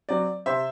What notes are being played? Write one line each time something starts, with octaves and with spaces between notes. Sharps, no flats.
F#3 C4 D5
C3 C5 E5